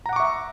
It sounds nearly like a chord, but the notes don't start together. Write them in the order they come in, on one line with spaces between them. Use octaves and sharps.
A#5 F#5 D6 C#6 E5